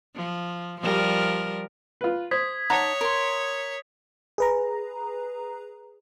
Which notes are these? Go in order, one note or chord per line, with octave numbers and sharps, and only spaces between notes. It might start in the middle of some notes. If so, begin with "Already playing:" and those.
F3
F3 G3 A#4
F4 B4
C5 D#6 G#6 B6
D#4 C#5 F#5 A5 A#5 D6
A#4 C6
G#4 B4 A#5